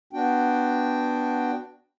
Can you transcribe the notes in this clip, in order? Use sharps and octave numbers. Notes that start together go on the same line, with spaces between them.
B3 D4 F#4 G5